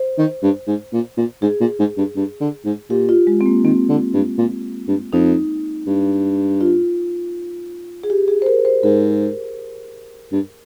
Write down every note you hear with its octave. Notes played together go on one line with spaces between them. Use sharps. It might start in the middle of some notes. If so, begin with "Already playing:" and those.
Already playing: C5
D#3
G2
G#2
A#2
A#2
G#2 G#4
A#2
G#2
G2
G2
D3
G#2
A#2 G4
F4
G#3
C4
A#3
D#3 C4
D3
G2
A#2
G2
F2 D#4
G2
F4
G#4
G4
G#4
C5
A#4
C5
G#2 A#4
G2